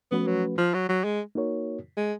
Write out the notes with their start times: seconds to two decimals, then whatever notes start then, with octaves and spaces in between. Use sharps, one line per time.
0.11 F3 A3 B3 C#4 F#4 B4
0.27 F#3
0.58 F3
0.74 F#3
0.89 F#3
1.04 G#3
1.35 A#3 D#4 F#4 A#4 C#5
1.97 G#3